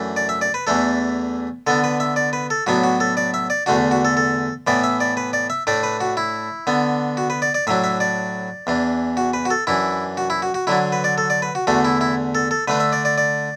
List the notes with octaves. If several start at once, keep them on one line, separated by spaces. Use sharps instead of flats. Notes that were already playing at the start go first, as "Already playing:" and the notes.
Already playing: F#2 E3 A3 D4
D5
E5
D5
B4
E2 E3 A3 D4 A4
D3 B3 D4 A4
B4
E5
D5
B4
A4
A2 F#3 B3 D4 F#4
F#4
A4
D5
E5
D5
E2 D3 A3 D4 F#4
F#4
A4
A4
A2 E3 B3 D5
E5
D5
B4
D5
E5
A2 A3 D4 D5
B4
F#4
E4
D3 B3 D4
F#4
B4
D5
D5
A2 F#3 D4 E5
E5
D5
E2 E3 D4
F#4
B4
F#4
A4
F#2 E3 D4 E4
F#4
E4
F#4
F#4
D3 F#3 D4 E4
B4
D5
A4
D5
B4
F#4
E2 D3 A3 D4 F#4
E4
E4
A4
A4
D3 A3 D4 B4
E5
D5
D5
D5